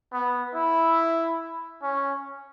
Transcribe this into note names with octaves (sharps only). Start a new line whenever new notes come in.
B3
E4
C#4